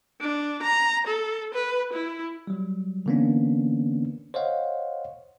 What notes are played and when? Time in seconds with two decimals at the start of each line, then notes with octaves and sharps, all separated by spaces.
0.20 D4
0.63 A#5
1.07 A4
1.54 B4
1.93 E4
2.47 F#3 G3
3.06 D3 E3 A#3 B3 C#4 D4
4.34 C5 C#5 D#5 F5 F#5